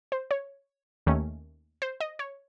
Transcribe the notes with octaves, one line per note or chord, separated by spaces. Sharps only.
C5
C#5
D#2 D#3 A3 C#4
C5
D#5
C#5